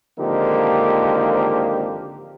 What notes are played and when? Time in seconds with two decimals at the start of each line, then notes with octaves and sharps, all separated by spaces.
0.19 G#1 D3 F3 A#3 D#4 G4